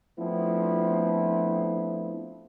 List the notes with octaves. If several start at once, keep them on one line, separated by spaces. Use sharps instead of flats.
F3 A3 B3 C4 D4 E4